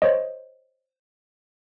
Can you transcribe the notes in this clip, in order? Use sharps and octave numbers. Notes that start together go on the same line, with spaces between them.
C5 C#5 D#5